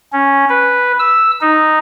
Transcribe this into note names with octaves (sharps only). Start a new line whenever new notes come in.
C#4
B4
E6
D#4